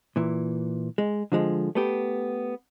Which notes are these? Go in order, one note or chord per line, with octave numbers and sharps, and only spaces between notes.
A#2 E3
G#3
D3 F3 G#3
A3 B3 G4